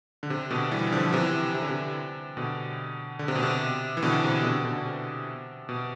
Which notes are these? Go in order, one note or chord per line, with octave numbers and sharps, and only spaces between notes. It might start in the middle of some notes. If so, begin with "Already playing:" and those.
D3
C3
B2 D3
E3 G3
D3 F3
C3 E3
C3
D3
C3
B2 D3
D3
C3
B2
C3
E3
B2 D3
C3 E3
B2 D3
B2 D3
B2
C3
B2